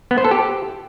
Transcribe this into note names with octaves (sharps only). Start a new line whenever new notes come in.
B3
C5
A4
G4